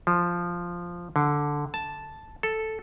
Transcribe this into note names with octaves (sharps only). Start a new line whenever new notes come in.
F3
D3
A5
A4